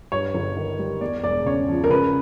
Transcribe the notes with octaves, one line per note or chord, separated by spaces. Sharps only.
G2 C#5
G1
D#3
G3
E2 D5
E1 D5
C#3 C#5
F3
A#4
C#3 B4